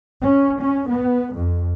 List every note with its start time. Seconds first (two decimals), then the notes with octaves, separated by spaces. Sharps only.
0.21 C#4
0.61 C#4
0.90 B3
1.34 F2